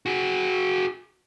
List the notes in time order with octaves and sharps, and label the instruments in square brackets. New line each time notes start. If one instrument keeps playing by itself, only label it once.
[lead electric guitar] F#4 G#4